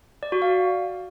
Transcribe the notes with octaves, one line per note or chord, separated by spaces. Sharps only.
D5
F#4
F5